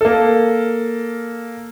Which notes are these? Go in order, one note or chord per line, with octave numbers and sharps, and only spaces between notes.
A#3 A4